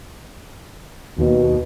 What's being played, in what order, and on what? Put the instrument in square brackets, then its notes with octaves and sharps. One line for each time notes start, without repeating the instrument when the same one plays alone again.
[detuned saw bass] D#2 [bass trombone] B2